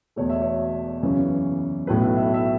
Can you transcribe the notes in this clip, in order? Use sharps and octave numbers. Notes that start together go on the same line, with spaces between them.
E1 E2 B2 A3 C#5
E5
C#5
F#2 C#3 E3 C#4
B1 A2 F#3 A3 E4 B4
E5
E5